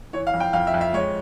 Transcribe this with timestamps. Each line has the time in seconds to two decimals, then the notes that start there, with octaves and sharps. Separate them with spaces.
0.13 E3 C#5
0.27 F5
0.34 F2
0.40 G5
0.53 F2 F5
0.67 E5
0.74 F2
0.81 E5
0.93 G#3 C#5